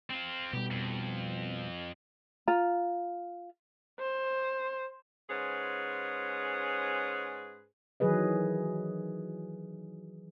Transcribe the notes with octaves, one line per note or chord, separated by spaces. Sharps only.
C4 F4
B2 G3 G4
F2
F4 A#5
C5
G#2 C#4 G#4 B4 C5
D#3 E3 F#3 G#4 B4 D#5